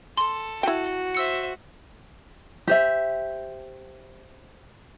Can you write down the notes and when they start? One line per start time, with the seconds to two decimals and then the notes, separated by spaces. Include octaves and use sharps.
0.17 A4 C6
0.63 E4 F#4 G5
1.15 C5 E5 E6 C#7
2.67 G4 C5 E5